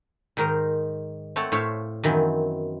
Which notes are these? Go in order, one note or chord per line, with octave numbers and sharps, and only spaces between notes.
G#2 D#3 D#4 A#4 C5 A#5
A3 C4 C#5 F#5 A5
A2 C5 C#5 E5 F5
F#2 D#3 E3 B3 C4